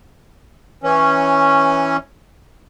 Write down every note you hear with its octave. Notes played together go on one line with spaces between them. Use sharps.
E3 C#4